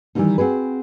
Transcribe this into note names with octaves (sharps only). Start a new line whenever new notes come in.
D#3 E3 G3 A3 A#3 D#4
C4 F#4 G#4 B4